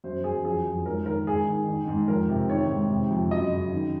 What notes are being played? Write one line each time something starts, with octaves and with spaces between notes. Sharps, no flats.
F#2 C5
F#2 G#4
F2 G#4
F2
G#2 A#4
D#3 A#4
G#2 G#4
D#3
D#3
G#2
F2 A#4
C3
D#3 C#5
G#2
C3
F2
F#2 D#5
C#3
D#3